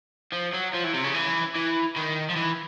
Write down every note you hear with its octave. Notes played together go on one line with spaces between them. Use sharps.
F3
F#3
F3
E3
C3
C#3
E3
E3
D#3
F3
E3